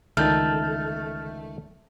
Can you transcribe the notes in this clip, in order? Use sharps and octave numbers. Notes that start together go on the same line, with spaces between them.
C#2 D3 D#3 A3 F6 G6 A6